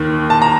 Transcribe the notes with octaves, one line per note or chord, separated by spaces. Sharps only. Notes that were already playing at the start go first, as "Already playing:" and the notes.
Already playing: D#2 D#3 A#3
A5
A#5